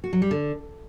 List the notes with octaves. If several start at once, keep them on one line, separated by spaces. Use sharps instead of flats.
F#4
F#3
G3
D3